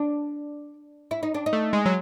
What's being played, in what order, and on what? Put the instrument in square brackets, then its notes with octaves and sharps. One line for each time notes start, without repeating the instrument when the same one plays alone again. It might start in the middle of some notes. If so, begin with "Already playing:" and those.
Already playing: [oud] D4
E4
D#4
D4
D#4
[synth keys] A3
G#3
F#3